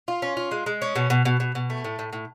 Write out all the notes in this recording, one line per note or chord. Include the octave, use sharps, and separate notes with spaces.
F4
C#4
F4
G#3
G#3
C#4
B2
B2
B2
B2
B2
A3
A2
A2
A2